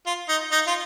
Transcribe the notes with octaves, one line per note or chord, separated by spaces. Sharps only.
F4
D#4
D#4
F4